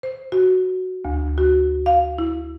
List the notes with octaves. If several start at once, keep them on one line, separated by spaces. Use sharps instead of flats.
C5
F#4
D2
F#4
F5
E4